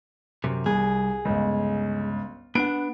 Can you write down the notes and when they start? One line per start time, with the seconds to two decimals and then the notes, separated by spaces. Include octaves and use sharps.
0.44 F#2 C3
0.66 C2 G#4
1.25 G1 C#2
2.55 B3 D4 F#5 D7